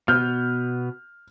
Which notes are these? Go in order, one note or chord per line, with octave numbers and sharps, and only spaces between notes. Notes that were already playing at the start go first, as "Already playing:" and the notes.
B2 B3 F6 G6